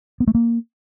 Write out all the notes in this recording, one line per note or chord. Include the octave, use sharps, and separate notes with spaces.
B3
A3
A#3